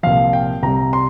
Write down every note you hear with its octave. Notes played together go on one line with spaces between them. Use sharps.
C2 A#2 F3 F5
G5
C2 C3 G3 A#5
C6